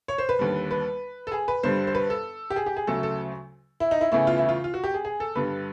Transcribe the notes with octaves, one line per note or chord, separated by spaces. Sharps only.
C#5
C5
B4
D#2 D3 G3
B4
A4
G#4
B4
G2 D3 G3 C5
C5
B4
A4
G4
G#4
G4
G#4
D2 C#3 F#3 A3 A4
A4
E4
D#4
E4
E2 C#3 E3 A3 E4
F4
E4
F4
F4
F#4
G4
G#4
G#4
A4
G2 D3 G3 B4